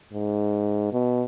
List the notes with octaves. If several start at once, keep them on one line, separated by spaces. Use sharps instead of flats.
G#2
B2